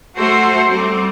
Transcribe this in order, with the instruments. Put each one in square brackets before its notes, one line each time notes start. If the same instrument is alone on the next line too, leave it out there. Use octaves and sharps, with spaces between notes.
[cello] A3 [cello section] F#4 A4 C5
[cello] G3 [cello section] C4